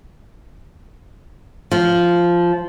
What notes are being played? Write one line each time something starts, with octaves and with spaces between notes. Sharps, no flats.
F3